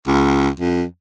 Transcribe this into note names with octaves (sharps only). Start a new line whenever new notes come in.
C#2
F2